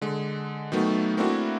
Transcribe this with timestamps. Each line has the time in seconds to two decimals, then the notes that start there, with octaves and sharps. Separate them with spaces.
0.01 D3 G#3
0.72 D#3 F#3 A3 B3
1.17 A3 A#3 C4 D4 E4 F#4